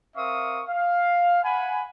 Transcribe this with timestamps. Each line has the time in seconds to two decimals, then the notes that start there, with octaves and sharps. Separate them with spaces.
0.16 C4 A#4 E5 F5 C#6 D#6
0.68 F5
1.43 F#5 G#5 B5